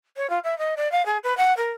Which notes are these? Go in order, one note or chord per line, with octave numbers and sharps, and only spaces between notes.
C#5
F4
E5
D#5
D5
F5
G#4
B4
F#5
A#4